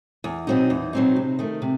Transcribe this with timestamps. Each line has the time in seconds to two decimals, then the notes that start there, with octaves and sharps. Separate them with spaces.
0.24 E2
0.47 B2 F#3 C4 D#4
0.70 E2
0.93 B2 F#3 C4 D#4
1.16 C3
1.39 D#3 A3
1.62 C3